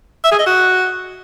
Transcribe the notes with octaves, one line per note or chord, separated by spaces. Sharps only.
E5
G#4
D#5
F#4